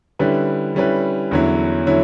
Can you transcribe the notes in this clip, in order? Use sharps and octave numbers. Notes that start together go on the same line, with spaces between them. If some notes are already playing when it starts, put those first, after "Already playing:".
D3 G3 C#4 E4 B4
D3 G3 C#4 E4 B4
E2 D3 F#3 C#4 E4
D3 F#3 C#4 E4